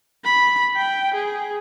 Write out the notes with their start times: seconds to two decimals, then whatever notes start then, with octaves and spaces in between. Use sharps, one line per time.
0.25 B5
0.76 G5
1.14 G#4